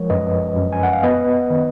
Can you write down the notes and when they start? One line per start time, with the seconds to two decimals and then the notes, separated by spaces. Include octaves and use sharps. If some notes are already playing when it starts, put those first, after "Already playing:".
Already playing: F3 G#3 A#4 C#5
0.10 F#2 B4 D#5
0.56 F#2
0.73 G#5
0.83 F#5
0.93 F5
1.03 B3 B4 D#5
1.50 D#3